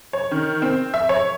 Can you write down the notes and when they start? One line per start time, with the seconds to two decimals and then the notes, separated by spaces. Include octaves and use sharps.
0.13 C#5
0.31 D#3
0.62 C4
0.94 E5
1.09 C#5